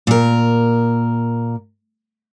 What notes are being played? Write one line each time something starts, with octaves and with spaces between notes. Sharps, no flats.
A#2 A#4